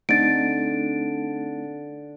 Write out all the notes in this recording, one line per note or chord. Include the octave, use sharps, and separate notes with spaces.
D3 A3 C4 D#4 A6 D7